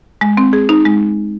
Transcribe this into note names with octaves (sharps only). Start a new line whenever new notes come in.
G#3
C4
G#4
D#4
G#3